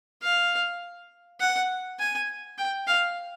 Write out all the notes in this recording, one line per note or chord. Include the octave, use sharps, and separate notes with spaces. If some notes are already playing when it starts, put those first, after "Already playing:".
F5
F#5
G#5
G5
F5